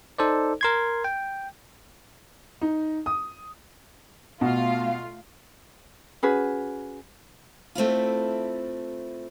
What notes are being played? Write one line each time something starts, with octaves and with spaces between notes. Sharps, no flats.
D#4 A4 C5 D5
A#4 C6 G#6
G5
D#4
D#6
B2 A3 F4 F5
C#4 F#4 G#4 B4
A3 C4 E4 F4